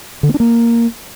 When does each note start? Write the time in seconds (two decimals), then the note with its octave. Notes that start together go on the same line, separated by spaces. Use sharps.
0.23 D3
0.29 A#3
0.34 D4
0.40 A#3